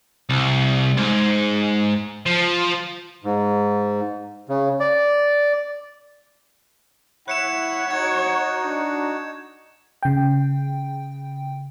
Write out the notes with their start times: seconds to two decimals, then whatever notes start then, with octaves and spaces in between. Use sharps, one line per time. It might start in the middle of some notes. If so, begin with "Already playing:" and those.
0.29 C2
0.97 G#2
2.26 F3
3.24 G#2
4.49 C#3
4.80 D5
7.28 E4 C#5 F#5 B5 F#6 C#7 E7
7.90 D#4 F#4 F#5 G#6
8.64 D4
10.03 C#3 G5